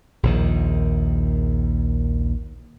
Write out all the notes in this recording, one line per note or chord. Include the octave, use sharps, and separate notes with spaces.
A#1 D#2 D#3